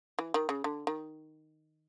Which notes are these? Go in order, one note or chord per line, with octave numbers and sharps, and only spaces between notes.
E3
D#3
C#3
D3
D#3